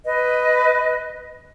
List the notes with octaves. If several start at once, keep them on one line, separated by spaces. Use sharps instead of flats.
B4 D#5